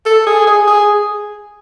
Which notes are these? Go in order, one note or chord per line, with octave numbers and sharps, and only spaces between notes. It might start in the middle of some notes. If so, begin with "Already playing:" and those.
A4
G#4
G#4
G#4